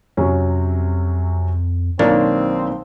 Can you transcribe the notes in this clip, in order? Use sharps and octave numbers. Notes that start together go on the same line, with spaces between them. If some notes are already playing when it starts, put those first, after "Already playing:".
F2 C3 F#3 C#4
B1 D#3 A#3 C4 D4 C#5 F5